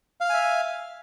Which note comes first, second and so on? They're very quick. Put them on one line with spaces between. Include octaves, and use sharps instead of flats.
F5 F6 G#5 E5